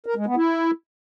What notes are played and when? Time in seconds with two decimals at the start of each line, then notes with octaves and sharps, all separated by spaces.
0.06 A#4
0.16 G#3
0.26 B3
0.36 E4